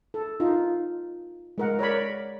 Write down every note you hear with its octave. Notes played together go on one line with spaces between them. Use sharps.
A4
D#4 F4
G#3 A#4 F#5
A#4 C#5 D5 B5